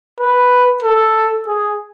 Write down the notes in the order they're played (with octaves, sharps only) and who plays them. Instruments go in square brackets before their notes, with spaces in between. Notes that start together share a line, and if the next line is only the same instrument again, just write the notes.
[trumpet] B4
A4
G#4